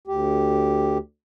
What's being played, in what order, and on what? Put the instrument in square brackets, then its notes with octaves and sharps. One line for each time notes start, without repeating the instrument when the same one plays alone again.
[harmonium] D2 G4